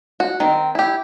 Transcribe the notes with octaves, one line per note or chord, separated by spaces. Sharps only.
F#4
D#3 C4
E4 G4